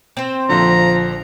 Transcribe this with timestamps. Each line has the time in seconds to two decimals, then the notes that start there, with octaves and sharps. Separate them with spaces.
0.17 C4 C5
0.49 A#1 D3 F3 A#5